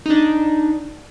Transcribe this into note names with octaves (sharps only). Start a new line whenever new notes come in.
D4 D#4